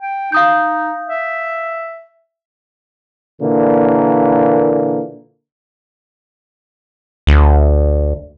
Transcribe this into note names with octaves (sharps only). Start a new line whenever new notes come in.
G5
D#4 F5 D#6 G6
E5
A#2 D3 E3 A#3
D2